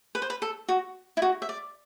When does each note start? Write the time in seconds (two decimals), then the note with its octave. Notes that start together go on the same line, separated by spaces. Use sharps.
0.15 B4
0.22 C5
0.30 B4
0.42 A4
0.69 F#4
1.17 E4
1.22 F#4
1.42 E5
1.49 D5